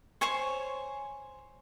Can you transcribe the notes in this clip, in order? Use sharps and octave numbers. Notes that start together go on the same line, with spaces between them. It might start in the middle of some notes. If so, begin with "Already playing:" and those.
C5 C#5 G#5 C#6